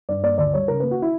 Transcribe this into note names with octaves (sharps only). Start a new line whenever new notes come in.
G2 D5
A#3 D5
D2 D5
G3 C#5
C#3 A#4
A#3 B4
F#4
E4